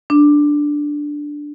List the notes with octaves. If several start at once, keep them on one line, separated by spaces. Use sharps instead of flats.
D4